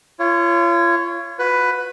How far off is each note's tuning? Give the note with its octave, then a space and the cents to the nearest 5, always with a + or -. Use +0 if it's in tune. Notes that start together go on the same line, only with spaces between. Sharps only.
F4 -35 C#5 +0
F#4 -40 B4 +10